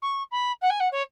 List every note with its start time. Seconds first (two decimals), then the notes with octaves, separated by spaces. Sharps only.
0.02 C#6
0.31 B5
0.61 F#5
0.70 G#5
0.80 F#5
0.92 C#5